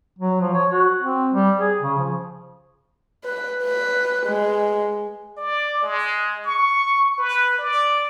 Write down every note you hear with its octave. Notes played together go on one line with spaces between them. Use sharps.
F#3
F3
C#5
F#4
C4
G3
G#4
C#3
F3
B4
B4
G#3
D5
G#3
C#6
B4
D5